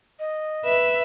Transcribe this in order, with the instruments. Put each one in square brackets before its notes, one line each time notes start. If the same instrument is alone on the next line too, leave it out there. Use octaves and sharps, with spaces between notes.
[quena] D#5
[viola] B4 [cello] E5